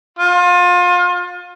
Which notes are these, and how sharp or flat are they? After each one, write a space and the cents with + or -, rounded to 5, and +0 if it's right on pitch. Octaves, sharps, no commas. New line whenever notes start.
F4 +30